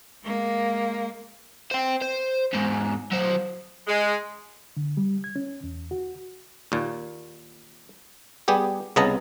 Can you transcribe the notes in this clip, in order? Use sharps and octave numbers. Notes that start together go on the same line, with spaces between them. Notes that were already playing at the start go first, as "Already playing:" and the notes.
G#3 A#3
C5 G5
C5
E2 G#2
F#3 C5
G#3
D3
G3
G#6
C#4
E2
F#4
D#2 A#2
G3 B3 G4 G#4
C2 C#3 B3 D#5 A5 A#5